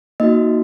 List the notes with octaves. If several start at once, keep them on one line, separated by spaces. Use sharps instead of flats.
A#3 D#4 F#4 D#5